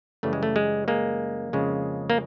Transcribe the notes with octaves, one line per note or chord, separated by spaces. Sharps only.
F#2 C#3 E3 G3 A3
G#3
A3
G#3
G#3 A#3
F2 C#3 F3 G#3
A#3